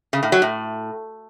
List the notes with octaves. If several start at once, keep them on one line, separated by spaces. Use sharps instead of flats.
C#3
A2
F#3
A2